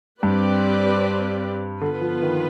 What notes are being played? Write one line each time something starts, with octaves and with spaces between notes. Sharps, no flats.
G2 C4 G4 B4 D5
D3 B3 F4 B4
F3
D#3